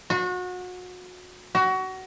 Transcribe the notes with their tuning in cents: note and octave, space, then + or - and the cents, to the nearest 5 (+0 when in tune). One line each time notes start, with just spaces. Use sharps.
F#4 -30
F#4 +25